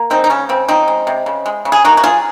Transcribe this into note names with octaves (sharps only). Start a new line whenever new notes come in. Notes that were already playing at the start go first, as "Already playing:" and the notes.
Already playing: A#3
G#3 C4 D#4
D#4
C#3 C#4
C#3 C4
F3 C4 D#4
G#3
C3
C#3
G#3
C#3
G#4
A#3 D#4 F#4
F#4
F#3 F4 G#4